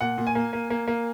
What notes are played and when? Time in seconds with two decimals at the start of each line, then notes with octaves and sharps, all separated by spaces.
0.01 A#2 F#5
0.18 A#2
0.27 G#5
0.35 A#3
0.53 A#3
0.70 A#3
0.88 A#3